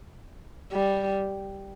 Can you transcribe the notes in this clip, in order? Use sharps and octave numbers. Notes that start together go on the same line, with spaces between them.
G3